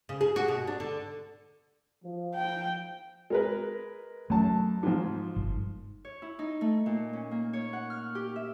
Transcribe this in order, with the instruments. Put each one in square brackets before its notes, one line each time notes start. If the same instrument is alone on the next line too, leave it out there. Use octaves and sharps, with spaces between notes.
[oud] C#3
G#4
F#4
B2
D4
D3
[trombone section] F3
[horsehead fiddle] G5
[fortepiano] G#3 A#4 B4
[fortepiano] F#2 A5 [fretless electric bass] A3
[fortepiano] G#2 F3
[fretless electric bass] G1
[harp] C#5
E4
D#4
A3
A#2
C#4
A#3
C#5
F#5
F6
G4
E5